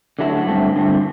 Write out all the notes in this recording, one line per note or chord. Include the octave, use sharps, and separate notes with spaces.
D3 F#3 A3 E4
G2 D3 A3 C4
G2 D3 A3 C4